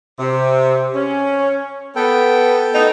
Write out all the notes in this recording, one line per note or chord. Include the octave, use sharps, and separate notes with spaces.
C3
C#4
B3 A4 G5
A3 B3 D#4